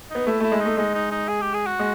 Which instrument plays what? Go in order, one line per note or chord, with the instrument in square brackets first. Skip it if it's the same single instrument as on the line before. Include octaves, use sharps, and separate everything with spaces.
[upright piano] B3 [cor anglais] D#4
[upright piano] A3 [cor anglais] E4
[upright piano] A3 [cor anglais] E4
[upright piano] G#3
[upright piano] A3 [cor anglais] D#4
[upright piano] G#3 [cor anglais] D#4
[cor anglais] D#4
D#4
G#4
G4
G#4
F#4
[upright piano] G#3